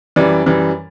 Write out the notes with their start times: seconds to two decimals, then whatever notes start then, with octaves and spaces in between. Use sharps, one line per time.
0.16 F#2 E3 G3 D5
0.46 F#2 E3 G3